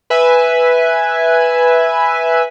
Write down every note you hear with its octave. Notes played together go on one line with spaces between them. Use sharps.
B4 E5 G#5